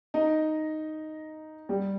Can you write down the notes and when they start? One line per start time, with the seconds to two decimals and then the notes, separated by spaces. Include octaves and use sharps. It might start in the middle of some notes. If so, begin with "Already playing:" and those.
0.14 D#4 D#5
1.69 G3 G4